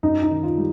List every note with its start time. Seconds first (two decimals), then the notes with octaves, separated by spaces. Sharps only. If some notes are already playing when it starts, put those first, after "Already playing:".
0.03 F#2 D#4
0.23 D#4
0.31 D#3
0.43 F4
0.57 G3